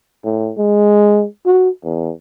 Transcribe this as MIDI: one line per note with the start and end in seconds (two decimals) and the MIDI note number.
0.25 0.52 45
0.58 1.26 56
1.46 1.69 66
1.84 2.12 40